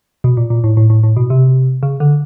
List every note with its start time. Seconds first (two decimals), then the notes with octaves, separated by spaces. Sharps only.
0.24 B2
0.37 A#2
0.50 A#2
0.64 A2
0.77 A2
0.90 A2
1.03 A2
1.17 B2
1.30 C3
1.83 C#3
2.00 D3